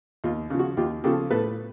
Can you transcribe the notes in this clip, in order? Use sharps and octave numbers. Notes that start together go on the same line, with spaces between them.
D#2 F4
C#3 F3
F#4
D#2 F4 G4
C#3 F3 G4 A4
A2 A4 B4